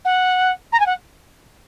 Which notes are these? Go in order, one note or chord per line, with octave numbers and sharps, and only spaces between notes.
F#5
A#5
G#5
F#5